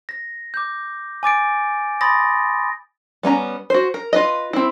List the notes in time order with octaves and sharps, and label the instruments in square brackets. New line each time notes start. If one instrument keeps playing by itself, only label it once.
[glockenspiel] A#6
D6 G6
G#5 D6 A6 D7
B5 C6 D#6 A6 A#6
[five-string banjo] G3 B3 C#4 A#5
F#4 C5
A#4
F4 B4 D#5
C4 E4